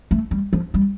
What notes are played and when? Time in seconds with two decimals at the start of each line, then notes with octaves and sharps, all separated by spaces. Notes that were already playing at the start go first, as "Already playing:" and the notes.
0.11 A3
0.31 G3
0.53 F3
0.74 G3